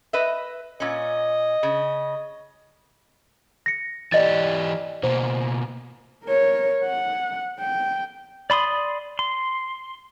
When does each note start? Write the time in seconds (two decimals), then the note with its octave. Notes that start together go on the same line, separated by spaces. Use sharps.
0.13 B4 D#5 E5
0.80 A#2 C#4 D#5
1.63 C#3
3.66 A#6 C#7
4.12 E3 G4 D5 D#5 A6
5.03 B2 A#3 C5
6.24 A#4 C#5
6.84 F#5
7.60 G5
8.50 D5 B5 C6 D#6
9.19 C6